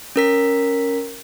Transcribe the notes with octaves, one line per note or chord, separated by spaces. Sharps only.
C#4 A#4 B6